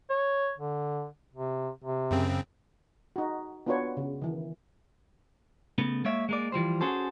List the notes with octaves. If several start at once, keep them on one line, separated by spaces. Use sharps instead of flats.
C#5
D3
C3
C3
F#2 C#3 C4
D#4 F#4
B3 D4 F4 F#4 B4 C#5
C#3
D#3 E3
C#3 A3 B3
G#3 A#3 C#5 E5
G#3 A#3 D5
E3 F3 G3 C5
C#4 F#4 G#4 A4 C5